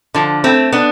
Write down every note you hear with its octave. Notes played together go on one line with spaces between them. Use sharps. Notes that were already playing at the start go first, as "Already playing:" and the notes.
D3 F3
A3 C4
B3 D4